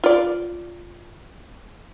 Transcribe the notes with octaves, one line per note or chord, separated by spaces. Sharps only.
F4 D5